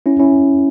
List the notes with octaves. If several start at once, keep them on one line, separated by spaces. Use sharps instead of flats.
C#4 E4
C#4 E4